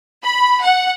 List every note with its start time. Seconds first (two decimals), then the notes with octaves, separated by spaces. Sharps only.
0.23 B5
0.63 F#5